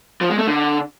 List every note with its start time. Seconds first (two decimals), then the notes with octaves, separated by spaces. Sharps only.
0.21 F3
0.30 G#3
0.38 A3
0.47 D3